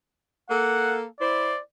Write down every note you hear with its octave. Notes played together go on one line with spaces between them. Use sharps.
A#3 A4 F#5
E4 C5 D5